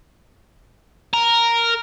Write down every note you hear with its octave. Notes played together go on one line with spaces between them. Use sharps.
A#4